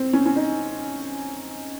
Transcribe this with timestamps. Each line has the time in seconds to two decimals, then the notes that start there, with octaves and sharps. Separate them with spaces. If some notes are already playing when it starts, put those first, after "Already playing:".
Already playing: C4
0.13 C#4
0.26 C#4
0.36 D#4